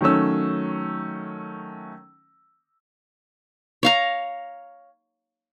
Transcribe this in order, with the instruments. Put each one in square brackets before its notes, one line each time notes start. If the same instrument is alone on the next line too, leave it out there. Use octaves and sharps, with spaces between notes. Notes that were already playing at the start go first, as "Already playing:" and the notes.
[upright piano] D#3 F#3 A3 C#4 E6
[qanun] C#5 F5 A#5